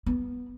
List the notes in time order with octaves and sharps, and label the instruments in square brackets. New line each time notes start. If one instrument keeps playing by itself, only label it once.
[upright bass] B3